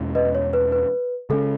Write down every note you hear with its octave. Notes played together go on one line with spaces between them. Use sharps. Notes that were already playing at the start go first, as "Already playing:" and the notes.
Already playing: E2 B2 G#3 C#4
B4 D#5
C#5
B4
B4
C#3 G#3 C#4 A4